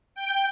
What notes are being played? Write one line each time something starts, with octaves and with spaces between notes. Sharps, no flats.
G5